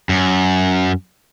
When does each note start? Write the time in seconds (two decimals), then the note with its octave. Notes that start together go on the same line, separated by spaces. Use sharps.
0.09 F#2